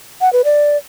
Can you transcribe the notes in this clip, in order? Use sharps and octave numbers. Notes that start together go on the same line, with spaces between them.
F#5
B4
D5